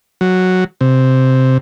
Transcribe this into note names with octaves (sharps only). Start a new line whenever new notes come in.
F#3
C3